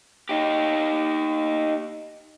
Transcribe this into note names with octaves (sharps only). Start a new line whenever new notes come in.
D#4 G4